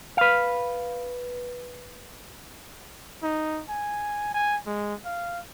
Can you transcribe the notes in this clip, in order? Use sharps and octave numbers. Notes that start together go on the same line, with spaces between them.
B4 F5
D#4
G#5
G#5
G#3
F5